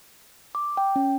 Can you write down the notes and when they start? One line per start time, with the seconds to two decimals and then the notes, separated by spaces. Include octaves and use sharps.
0.55 D6
0.77 G5
0.96 C#4